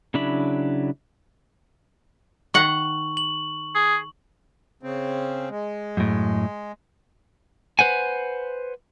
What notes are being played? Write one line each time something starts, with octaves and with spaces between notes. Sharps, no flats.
C#3 F#3 D4 E4 B5
D#3 F#5 C#6 F#7
F#7
G#4
C#3 C4
G#3
F#2 A2
B4 C5 F#5 G#5